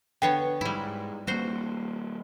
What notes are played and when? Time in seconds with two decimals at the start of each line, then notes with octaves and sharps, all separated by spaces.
0.22 D3 B3 C#5 G5
0.61 G#2 G3 E4
1.27 G3 A#3 F#4 C5